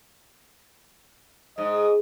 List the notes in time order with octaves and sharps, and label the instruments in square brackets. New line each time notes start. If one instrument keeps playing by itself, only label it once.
[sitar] G#2 [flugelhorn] D#5